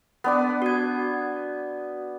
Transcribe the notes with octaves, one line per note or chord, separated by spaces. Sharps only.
B3 D4 D6
F#4 G#6